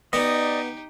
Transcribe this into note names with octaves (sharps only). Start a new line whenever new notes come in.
B3 D#4 G4 D5 D#5